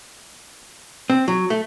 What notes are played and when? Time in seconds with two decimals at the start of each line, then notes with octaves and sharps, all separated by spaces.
1.10 C4
1.28 F#3
1.50 A3